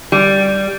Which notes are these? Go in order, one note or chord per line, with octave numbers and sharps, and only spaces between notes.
G3